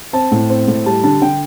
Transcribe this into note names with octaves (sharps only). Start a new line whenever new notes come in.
C4 A5
A2
C4
A2
G3 A5
D3 A5
D3 G5